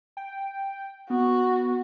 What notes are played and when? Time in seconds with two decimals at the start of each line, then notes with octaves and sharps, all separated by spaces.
0.17 G5
1.10 B3 F#4